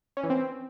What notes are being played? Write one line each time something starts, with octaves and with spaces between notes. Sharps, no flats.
C#4
E3
C4